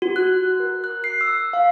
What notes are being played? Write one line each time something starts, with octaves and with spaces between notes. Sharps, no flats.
F#4
F#6
A#4
F#6
C7
E6
F5